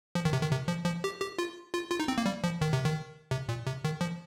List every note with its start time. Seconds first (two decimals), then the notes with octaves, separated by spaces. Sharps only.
0.15 F3
0.25 D#3
0.33 C3
0.42 D#3
0.52 C3
0.68 F3
0.85 F3
1.04 G4
1.22 G4
1.39 F4
1.74 F4
1.91 F4
2.00 D#4
2.08 C4
2.18 A#3
2.26 G3
2.44 F3
2.61 D#3
2.73 C3
2.85 D#3
3.31 C3
3.49 A#2
3.67 C3
3.84 D#3
4.01 F3